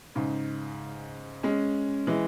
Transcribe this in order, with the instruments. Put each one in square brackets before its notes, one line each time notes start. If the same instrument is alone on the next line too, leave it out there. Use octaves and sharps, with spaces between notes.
[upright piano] G#2 C#3
G#3 C#4
E3 G#3